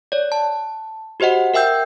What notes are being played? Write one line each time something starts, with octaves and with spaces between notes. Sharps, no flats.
C#5 D5
A5
F#4 G4 C5 D#5 F#5
A#4 E5 G5 E6 G6